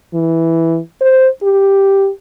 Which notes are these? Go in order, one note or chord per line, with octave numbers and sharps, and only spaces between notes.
E3
C5
G4